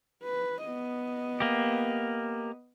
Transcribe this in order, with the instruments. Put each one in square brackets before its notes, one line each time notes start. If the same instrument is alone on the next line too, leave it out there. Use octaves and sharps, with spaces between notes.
[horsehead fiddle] B4
B3 D#5
[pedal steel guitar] A#3 G4